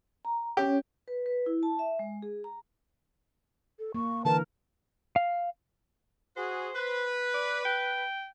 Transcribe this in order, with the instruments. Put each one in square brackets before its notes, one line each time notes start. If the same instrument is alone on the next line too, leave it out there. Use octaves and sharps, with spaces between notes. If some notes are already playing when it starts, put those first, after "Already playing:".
[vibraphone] A#5
[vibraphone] C#4 C#5 [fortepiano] G4
[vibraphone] B4
B4
E4
A5
E5
G#3
G#4
A#5
[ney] A4
[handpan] A#3 [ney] C#6
[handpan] D3 E3 A#4 [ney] B4 [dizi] A5
[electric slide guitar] F5
[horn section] F#4 G#4 [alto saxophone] C5
[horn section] B4
[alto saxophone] D5
G5